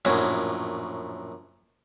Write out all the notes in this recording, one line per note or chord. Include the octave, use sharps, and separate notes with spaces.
A#1 F#2 A2